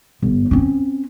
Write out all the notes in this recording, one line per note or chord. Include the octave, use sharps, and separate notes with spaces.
G1
C4 C#4